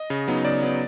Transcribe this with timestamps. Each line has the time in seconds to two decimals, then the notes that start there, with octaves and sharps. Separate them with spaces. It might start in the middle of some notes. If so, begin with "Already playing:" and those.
Already playing: D#5
0.10 C#3
0.27 F#3 B3 D#4
0.44 C#3 D5
0.63 F#3 B3 D#4